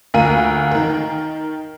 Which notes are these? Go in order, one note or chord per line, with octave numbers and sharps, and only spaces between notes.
D2 A#3 F4 A#4 D#7
D#3 A#4